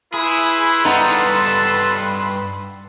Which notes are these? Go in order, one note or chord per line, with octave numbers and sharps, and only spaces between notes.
E4 G#4 B4 C6
G2 B3 D#4 F4 A4